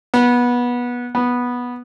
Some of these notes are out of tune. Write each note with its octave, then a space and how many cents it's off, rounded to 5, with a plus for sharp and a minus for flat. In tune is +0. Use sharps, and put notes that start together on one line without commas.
B3 -20
B3 -10